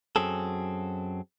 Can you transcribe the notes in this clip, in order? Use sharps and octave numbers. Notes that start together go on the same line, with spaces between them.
F#2 F#3 C4 G#4 A4